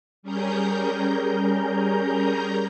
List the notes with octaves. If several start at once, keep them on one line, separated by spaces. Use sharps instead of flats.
G3 C#4 G#4 A#4 A#5 G6